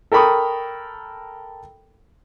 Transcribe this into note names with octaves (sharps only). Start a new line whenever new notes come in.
A4 A#4 G5 B5 C#6 D#6